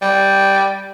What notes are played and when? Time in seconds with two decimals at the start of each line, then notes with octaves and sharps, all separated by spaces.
0.02 G3